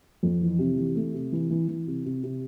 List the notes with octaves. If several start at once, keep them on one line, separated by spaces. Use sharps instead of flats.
F2
E3
C3
E3
A3
C3
E3
E3
E3
C3
C3
C3